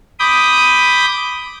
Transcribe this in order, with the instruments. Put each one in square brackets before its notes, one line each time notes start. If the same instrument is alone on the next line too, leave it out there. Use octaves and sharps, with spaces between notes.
[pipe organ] B5 D6 D#6 G6